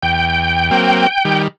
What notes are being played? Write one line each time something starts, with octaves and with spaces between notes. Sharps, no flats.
E2 G5
F#3 A#3 C4
D#3 G3